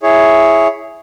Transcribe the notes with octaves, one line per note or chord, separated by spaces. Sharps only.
E4 G#4 C#5